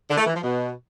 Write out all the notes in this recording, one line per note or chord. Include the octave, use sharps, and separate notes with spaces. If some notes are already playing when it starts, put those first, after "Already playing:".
D3
A3
E3
F3
B2